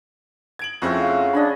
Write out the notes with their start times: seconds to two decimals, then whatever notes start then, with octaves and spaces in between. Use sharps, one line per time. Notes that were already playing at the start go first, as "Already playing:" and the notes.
0.59 G#6 D7 F#7
0.82 F2 C#3 A3 C4 E4 F#4
1.00 F5
1.33 D4 D#5 G#5 B5